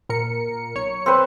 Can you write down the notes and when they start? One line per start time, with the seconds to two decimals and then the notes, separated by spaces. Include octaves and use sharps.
0.09 A#2 A#4 C#7
0.75 B1 C#5 C#7
1.06 C4 B4